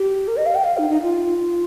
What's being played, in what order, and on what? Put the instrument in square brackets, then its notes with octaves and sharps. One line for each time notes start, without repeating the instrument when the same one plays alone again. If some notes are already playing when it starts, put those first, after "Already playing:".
Already playing: [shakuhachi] G4
A#4
D#5
F5
G5
F5
D#4
D#4
F4